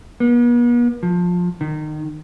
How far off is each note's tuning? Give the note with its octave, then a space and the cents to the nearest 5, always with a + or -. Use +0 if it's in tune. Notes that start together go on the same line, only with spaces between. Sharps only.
B3 -45
F3 +20
D#3 -25